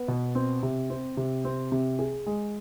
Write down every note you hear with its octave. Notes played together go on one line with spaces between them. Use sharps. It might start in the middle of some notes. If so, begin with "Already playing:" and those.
Already playing: B3
B2
C4
C3
C4
C3
C4
C3
G#4
G#3